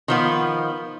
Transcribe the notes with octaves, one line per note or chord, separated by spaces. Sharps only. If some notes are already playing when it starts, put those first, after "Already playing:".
D#3 F3 B3